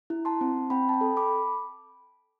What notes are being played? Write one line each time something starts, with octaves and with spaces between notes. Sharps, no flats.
E4
A5 C6
C4
C4 G5 B5
A5
G5 B5
A4
B5 D6